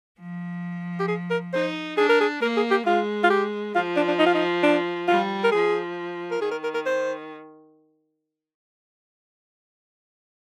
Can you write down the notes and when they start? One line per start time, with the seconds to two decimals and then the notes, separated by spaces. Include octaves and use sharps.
0.19 F3
1.00 G4
1.08 G#4
1.30 A#4
1.53 D#4 C5
1.97 D4 G#4
2.09 A#4
2.20 G#4
2.42 A#3 A#4
2.57 G#4
2.71 G4
2.86 G#3 F4
3.24 F4
3.30 G4
3.75 F3 F4
3.96 D4
4.08 D4
4.19 D#4
4.26 F4
4.34 D#4
4.63 D4
5.08 G3 F4
5.44 A#4
5.52 F3 G#4
6.31 A#4
6.41 D#3 G#4
6.52 A#4
6.64 A#4
6.74 A#4
6.86 C5